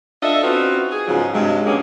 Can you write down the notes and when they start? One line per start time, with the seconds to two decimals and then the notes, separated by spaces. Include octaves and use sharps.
0.23 D4 F4 A4 D#5 E5
0.43 C4 C#4 D#4 F4 F#4 B4
0.91 G#4
1.07 G#2 C#3 F3 F#3 B3 F4
1.33 G2 C3 F3 F#3 G#3
1.66 D3 D#3 G#3 A#3 B3 C#4